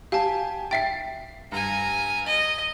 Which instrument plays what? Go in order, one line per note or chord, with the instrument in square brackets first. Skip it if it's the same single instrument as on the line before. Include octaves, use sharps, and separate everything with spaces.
[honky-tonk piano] G4 G#5 [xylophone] F5 A5
[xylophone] E5 G5 [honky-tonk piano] A6 B6 C7
[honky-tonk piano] G2 [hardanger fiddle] G#5 A#5
[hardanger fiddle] D#5